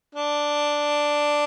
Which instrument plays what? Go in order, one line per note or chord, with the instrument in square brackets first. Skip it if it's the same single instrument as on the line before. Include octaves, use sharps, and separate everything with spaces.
[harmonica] D4